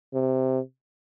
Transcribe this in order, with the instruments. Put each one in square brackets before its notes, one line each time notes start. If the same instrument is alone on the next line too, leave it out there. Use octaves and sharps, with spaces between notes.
[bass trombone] C3